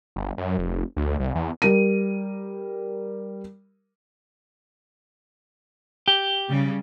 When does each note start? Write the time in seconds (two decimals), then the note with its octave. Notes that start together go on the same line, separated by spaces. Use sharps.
0.16 G1
0.38 F#2
0.58 F1
0.97 D2
1.20 C2
1.35 E2
1.62 G3 A#4 D#7
6.08 G4
6.49 C#3 G3